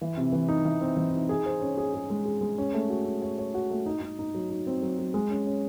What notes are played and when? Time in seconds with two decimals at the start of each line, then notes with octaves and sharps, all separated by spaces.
0.01 E3
0.17 C3
0.32 E3
0.49 D#4
0.65 E3
0.81 C4
0.97 E3
1.14 D#4
1.29 G#4
1.46 C5
1.61 C#4
1.78 G#4
1.94 G#4
2.10 G#3
2.25 G#4
2.41 G#3
2.58 C#4
2.73 A3
2.90 F#4
3.06 C#4
3.22 C#5
3.38 C#5
3.54 F#4
3.70 A3
3.86 D#4
4.02 D#4
4.19 D#4
4.35 F#3
4.50 D#4
4.67 C4
4.83 F#3
4.99 F#3
5.14 G#3
5.30 C#4
5.46 C#4